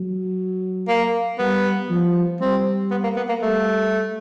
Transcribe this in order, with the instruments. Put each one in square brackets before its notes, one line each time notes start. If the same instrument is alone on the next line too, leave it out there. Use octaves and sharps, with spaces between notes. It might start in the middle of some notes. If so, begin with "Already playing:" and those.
Already playing: [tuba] F#3
[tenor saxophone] A#3
[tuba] G3 [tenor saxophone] B3
[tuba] F3
[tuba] G3 [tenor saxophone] C4
[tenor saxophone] B3
A#3
B3
A#3
[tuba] G3 [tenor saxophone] A3